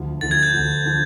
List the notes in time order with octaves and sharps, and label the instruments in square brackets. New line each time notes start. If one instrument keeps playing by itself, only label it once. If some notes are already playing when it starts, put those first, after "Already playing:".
Already playing: [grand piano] D2 D3 F3
[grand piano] D2 D3 F3 [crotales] A6
[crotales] G#6
G6
[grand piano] D2 D3 F3
D3 F3